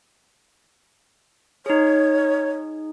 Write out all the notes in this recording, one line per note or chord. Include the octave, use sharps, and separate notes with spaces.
D#4 G#4 C#5